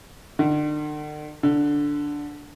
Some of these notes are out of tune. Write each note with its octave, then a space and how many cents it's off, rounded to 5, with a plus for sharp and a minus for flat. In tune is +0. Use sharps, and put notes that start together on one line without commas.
D3 +40
D3 -5